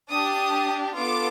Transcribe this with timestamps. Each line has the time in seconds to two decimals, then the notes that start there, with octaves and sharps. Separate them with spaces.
0.12 D4 G4 D#6
0.96 B3 D4 F4 A4 D6